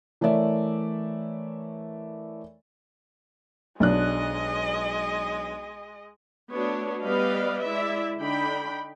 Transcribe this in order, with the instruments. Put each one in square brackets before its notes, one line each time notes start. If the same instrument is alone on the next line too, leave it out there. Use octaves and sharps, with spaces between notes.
[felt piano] E3 A3 A#4 C#5 D5 E5
[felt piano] B1 D4 F#6 [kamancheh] G#3 D#5
[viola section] A3 B3 D4 F#4 C#5
G3 B3 B4 D5 D#5 F5
G#3 E4 D5 E5
D3 D4 D#4 G5 B5